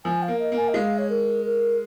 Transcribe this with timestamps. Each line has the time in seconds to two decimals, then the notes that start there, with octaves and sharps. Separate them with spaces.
0.05 F3 G#5
0.23 F5
0.28 A#3
0.39 D#5
0.52 A#3 G#5
0.69 D#5
0.74 G#3 F5
0.98 C#5
1.10 A#4
1.45 A#4